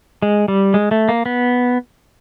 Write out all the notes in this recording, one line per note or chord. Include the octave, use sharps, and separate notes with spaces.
G#3
G3
G#3
A3
A#3
B3